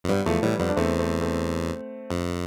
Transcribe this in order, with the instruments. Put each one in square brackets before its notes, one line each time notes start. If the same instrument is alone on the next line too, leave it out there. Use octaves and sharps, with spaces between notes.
[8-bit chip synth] F2
[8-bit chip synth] G2 [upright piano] G3 B3
[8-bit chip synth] E2 [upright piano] F3 A3
[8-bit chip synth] A2 [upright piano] E3 G3
[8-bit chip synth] F2 [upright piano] G3 B3
[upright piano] D4
[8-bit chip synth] E2 [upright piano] A3 C4
[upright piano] A3 C4
A3 C4
[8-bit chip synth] F2